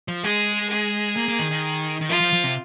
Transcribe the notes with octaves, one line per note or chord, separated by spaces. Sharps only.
F3
G#3 G#4
G#4
A#3
A#3
D#3
D#3
D#3
F3 F4
F3
F3
C3